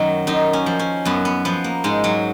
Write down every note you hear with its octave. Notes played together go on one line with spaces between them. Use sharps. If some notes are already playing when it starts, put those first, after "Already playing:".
Already playing: F#2 D#3 F#3
F#2 D#4
C#4
F3
C#4
F#2 B3
B3
F3 B3
A#3
G#2 G#3
F#3